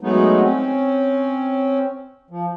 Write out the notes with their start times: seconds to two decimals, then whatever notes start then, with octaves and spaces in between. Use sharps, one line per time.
0.01 F#3 G#3 A3 B3 D#4
0.41 C4 C#4
2.31 F3